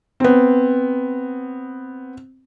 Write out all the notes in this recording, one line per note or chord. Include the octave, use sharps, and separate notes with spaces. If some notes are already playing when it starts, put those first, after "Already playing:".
B3 C4